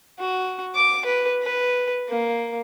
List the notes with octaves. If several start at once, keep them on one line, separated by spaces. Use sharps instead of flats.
F#4
D6
B4
B4
A#3